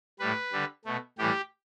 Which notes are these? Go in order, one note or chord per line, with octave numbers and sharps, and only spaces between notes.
A2 G3 B4
D3 G3
B2 A3
A2 E3 G3 G4